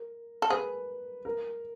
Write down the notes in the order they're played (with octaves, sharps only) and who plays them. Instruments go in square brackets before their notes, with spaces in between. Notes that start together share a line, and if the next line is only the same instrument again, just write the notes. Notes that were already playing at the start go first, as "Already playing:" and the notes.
Already playing: [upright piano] A#4
[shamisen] A4
[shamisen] G#4 [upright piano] B4
[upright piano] A#4